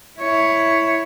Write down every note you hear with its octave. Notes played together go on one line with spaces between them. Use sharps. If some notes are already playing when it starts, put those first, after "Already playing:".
E4 C#5